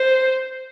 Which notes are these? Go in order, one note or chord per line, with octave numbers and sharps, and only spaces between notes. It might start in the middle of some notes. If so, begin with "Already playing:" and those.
Already playing: C5